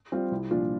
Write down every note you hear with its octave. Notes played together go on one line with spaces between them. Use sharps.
G3 C4 F4
C2
A#2 F3 D4 F4